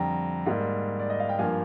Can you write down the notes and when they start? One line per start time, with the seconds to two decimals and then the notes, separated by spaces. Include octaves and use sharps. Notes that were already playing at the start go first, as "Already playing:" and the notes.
Already playing: F2 D3 G3 G5 A#5
0.46 G#2 G3 A#3
0.99 D5
1.10 D#5
1.20 F5
1.29 G5
1.39 G2 F3 A#3 F5 G#5